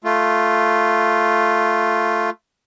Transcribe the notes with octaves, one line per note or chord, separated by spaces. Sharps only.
A3 F4